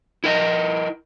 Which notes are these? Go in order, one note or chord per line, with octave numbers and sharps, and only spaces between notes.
E4 A#4 D#5